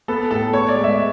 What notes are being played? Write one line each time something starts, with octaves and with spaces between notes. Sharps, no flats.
B3 A4
A2 A4
B3 C#5
D5
G#3
E5